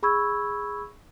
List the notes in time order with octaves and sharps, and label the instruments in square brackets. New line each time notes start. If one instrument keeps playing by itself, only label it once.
[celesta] G#4 B5 C#6 E6 G#6